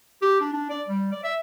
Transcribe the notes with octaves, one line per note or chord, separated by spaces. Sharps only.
G4
D4
D4
D5
G3
D5
E5